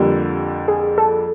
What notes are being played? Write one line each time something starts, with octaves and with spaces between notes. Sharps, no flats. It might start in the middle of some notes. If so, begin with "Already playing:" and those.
Already playing: F2 D3 G3 A#3 G4
G#4
A4